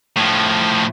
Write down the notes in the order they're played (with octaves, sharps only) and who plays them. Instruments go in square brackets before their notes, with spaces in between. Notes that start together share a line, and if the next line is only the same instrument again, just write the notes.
[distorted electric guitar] A2 F3